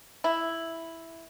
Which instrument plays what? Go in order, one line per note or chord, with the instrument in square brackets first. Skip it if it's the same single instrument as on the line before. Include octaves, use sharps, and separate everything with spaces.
[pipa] E4